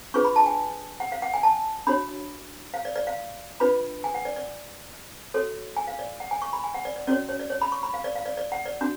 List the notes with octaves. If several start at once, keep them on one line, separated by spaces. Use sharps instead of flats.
D4 F4 G#4 B4 C#6
B5
A5
G#5
F#5
F5
F#5
G#5
A5
D4 F#4 C#5 B5
F5
D5
D5
F5
D4 F4 B4 B5
G#5
F#5
D5
D5
F#4 A4 C#5
G#5
F5
D5
F#5
G#5
C#6
B5
G#5
F#5
D5
D5
C#4 F#4 C#5 D5
C#5
D5
C#5
B5
C#6
B5
F5
D5
F5
D5
D5
F#5
D5
D4 F#4